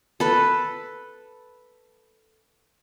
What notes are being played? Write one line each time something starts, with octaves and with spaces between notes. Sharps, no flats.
A4 B4